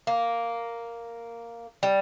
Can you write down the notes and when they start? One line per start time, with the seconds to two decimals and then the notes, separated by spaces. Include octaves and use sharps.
0.07 A#3
1.83 G3